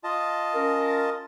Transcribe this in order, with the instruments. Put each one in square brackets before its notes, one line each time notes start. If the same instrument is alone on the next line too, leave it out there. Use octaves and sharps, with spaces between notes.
[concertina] F4 D#5 A5
[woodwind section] C#4 A#4